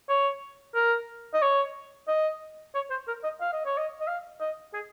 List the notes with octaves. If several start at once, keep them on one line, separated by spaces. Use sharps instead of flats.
C#5
A#4
D#5
C#5
D#5
C#5
C5
A#4
D#5
F5
D#5
C#5
D#5
D#5
F5
D#5
G#4